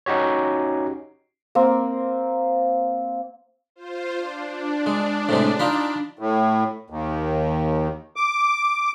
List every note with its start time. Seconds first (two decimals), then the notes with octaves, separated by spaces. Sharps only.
0.06 C#4 D#4 F#4 G4 C#5
1.55 A#3 C4
3.76 F4 C5
4.17 D4
4.87 G#3
5.29 A2 C3 G#3
5.59 D#4 F4 B5
6.19 A2
6.90 D#2
8.16 D6